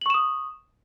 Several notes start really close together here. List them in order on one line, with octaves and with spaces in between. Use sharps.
F#7 C#6 E7 D#6